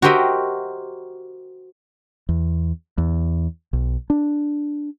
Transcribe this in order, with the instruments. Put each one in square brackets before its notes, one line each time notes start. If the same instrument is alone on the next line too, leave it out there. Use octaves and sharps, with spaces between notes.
[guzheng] F#4 G4 A#4 C5 D#5 E5
[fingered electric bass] E2
E2
B1
D4